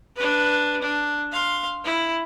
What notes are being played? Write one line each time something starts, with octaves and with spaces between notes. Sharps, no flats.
D4 B4
D4
F5 C6
E4